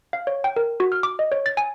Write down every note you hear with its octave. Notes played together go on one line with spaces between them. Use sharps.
F5
C#5
G5
A#4
F#4
F6
D6
D#5
C#5
A6
G#5